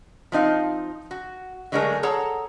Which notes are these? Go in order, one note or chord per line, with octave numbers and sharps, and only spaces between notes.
F3 C4 D#4 F5
F#4
D3 F#3 G#3 A3 G#4 A#4
G#4 A4 C#5 F#5 A#5